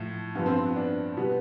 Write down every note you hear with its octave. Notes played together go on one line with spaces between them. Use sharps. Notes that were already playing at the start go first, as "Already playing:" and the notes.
Already playing: A2 F3
G2 F3 B3
C4
B3
D4
B2 G3 B3